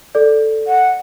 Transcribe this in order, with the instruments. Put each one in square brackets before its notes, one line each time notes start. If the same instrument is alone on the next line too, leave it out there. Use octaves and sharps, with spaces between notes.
[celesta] A4 D5
[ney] F#5